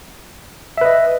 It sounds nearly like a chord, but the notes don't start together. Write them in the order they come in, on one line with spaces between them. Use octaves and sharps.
E5 B4 D#5